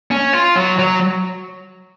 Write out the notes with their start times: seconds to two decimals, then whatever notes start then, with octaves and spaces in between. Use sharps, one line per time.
0.11 C#4
0.33 F4
0.56 F#3
0.79 F#3